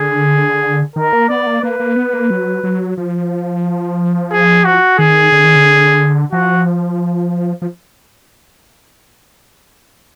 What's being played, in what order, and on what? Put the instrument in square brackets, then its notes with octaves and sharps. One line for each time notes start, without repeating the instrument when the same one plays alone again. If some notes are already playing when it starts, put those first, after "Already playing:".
Already playing: [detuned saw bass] D3 [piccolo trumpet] G#4
[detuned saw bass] D#3 [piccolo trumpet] A#4
[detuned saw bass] A#3
[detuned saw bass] B3 [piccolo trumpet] D5
[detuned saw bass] A#3
[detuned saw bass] A#3 [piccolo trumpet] B4
[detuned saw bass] A#3
B3
A#3
F#3
F#3
F3
[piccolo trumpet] G#4
F#4
[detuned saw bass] D#3 [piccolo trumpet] G#4
[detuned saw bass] D3
D#3
D3
[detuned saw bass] F3 [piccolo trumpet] F#4
[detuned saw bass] F3